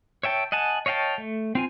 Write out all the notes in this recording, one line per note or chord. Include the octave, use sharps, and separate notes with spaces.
C#5 E5 G5 A5
D#5 F#5 G#5 A5
C#5 D#5 F5 G5 A5
A3
C4 F4 G#5